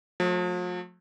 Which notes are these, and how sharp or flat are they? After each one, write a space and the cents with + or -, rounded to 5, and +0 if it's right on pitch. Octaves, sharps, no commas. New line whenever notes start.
F3 +45 A3 +0